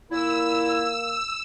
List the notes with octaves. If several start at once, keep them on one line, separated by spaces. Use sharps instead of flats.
A#2 A#3 E4 E6